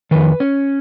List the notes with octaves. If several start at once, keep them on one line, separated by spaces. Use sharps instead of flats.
F2 D#3 B4
C#4